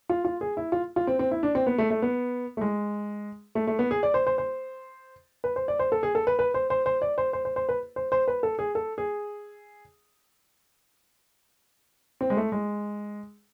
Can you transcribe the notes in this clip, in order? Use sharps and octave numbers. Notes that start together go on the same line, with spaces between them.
F4
F4
G#4
E4
F4
F4
C4
C4
E4
D4
C4
B3
A3
A3
B3
A3
G#3
A3
A3
B3
G#4
D5
C5
C5
C5
B4
C5
D5
C5
A4
G#4
A4
B4
B4
C5
C5
C5
D5
C5
C5
C5
C5
B4
C5
C5
B4
A4
G#4
A4
G#4
C4
G#3
A3
G#3